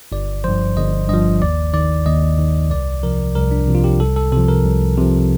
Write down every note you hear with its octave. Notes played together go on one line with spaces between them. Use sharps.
G1 D5
G2 F3 C5
G1 D#5
G2 F3 D#5
D#2 D5
D#3 D5
D#2 D#5
D#3
C2 D5
C3 F3 A#4
C2 A#4
D4
C3 F3
F4
G4
C2 A4
A4
C3 F3 A4
A#4
C2
C3 F3